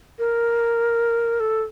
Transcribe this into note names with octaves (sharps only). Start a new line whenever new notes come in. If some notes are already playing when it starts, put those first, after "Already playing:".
A#4
A4